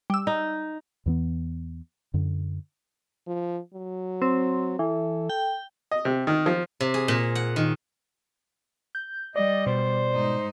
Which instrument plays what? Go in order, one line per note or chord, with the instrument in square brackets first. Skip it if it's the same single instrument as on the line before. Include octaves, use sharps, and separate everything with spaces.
[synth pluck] G3 E6
[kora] D#4
[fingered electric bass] E2 E3 B3
F#2 D3
[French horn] F3
F#3
[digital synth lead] C4
[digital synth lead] E3 [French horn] A4
[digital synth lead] G5
[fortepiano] D#5
C3
D#3
F3
[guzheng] C3
G#4
A#2
F#5
D#3
[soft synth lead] G6
[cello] G3 [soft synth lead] D5 [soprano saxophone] D#5
[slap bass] B2 [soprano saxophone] C5
[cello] G#2 D#4